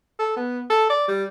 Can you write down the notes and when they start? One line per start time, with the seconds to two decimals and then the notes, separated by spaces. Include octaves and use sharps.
0.19 A4
0.37 B3
0.70 A4
0.90 D5
1.08 G3